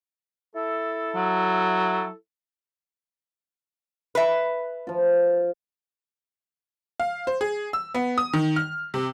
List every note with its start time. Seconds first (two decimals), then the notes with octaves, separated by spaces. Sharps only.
0.55 E4 A4
1.15 F#3
4.15 B4 E5
4.87 F3 F4
7.00 F5
7.27 C5
7.41 G#4
7.73 E6
7.94 B3
8.18 D#6
8.33 D#3
8.56 F6
8.94 C3